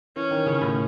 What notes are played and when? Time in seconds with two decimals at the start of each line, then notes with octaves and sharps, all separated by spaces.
0.16 E3 C#4
0.31 D#3
0.46 C#3
0.61 A2